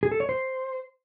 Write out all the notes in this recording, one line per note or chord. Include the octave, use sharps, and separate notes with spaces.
G#4
A4
C#5
C5